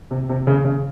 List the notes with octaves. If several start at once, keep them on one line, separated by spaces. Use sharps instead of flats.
C3
C3
C#3
C#3